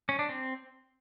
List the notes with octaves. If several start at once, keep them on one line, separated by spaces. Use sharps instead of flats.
C#4
D4
C4